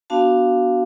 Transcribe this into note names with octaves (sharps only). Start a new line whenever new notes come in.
B3 D4 F#4 F5 A5